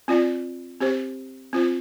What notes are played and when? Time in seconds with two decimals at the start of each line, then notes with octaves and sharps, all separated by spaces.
0.08 C4 F4 D5
0.80 C4 G4 C5
1.53 C4 F4 C5